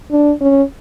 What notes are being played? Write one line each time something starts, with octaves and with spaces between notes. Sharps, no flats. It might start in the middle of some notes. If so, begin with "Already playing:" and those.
D4
C#4